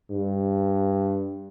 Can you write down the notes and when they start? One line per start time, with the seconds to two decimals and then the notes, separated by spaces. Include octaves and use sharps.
0.10 G2